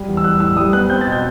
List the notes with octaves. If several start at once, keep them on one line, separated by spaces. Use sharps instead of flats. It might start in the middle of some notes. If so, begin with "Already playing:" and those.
Already playing: G3
E2
E6
G3 F#6
A2 E6
G3 D#6
B3 F#6
C4 G6
A6
B2
G6